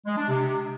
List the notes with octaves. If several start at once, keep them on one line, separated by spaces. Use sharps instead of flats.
G#3
D4
C3